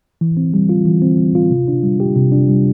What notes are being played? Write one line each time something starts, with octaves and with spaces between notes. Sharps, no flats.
E3
C4
G3
F4
E3
C4
G3
F4
C3
D4
G3
G4
C3
D4
G3